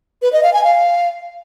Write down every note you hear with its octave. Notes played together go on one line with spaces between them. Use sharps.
B4
D#5
F5
G#5
F5